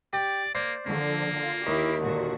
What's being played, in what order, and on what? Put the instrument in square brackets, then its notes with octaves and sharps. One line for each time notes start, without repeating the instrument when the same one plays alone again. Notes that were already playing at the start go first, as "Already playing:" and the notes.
[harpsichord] G4 [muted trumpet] D5
[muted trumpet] A#3 [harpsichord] C5 D5
[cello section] D3 F3 [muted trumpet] A#3
[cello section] F4
[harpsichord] D#2 [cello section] E4 G4
[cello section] A#2 D3 F#4